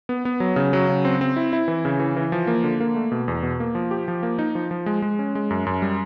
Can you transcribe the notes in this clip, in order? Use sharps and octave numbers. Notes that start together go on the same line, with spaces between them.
B3
B3
F#3
C#3
F#3
C#3
C4
C4
E4
E4
E3
C#3
E3
E3
F3
A#3
D3
A#3
A3
B2
E2
B2
A#3
F3
G4
F3
A#3
D#4
F3
F3
G#3
G#3
C#4
G#3
F#2
F#2
G3